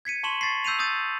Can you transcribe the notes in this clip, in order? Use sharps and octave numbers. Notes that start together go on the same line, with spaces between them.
G#6 B6 C#7 D#7
A5 C6 C#6 E7 F#7
C#6 A6 B6 C7
E6 G6 C7 D#7 F7
D#6 E6 G6 A6 D#7